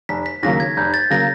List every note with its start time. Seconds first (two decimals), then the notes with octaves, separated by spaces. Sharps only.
0.09 F1 B6
0.26 B6
0.43 D#2 C#3 F#3 A#3 A#6
0.60 G#6
0.77 F1 G6
0.94 A6
1.10 C#3 F#3 A#3 A#6